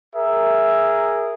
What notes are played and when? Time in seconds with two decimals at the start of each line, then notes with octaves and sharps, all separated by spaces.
0.13 G#4 A#4 E5